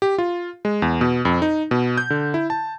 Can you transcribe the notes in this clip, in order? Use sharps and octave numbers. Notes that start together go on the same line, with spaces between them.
G4
F4
G#3
E2
B2
F2
D#4
B2
G6
D3
E4
A5